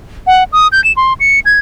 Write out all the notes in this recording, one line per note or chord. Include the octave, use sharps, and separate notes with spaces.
F#5
D#6
G6
E7
C6
C#7
G#6